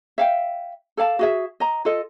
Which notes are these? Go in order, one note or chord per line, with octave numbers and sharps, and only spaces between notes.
E5 F5 G5
A4 D5 F5 A5
F#4 G#4 E5
D#5 A#5
F4 A4 D#5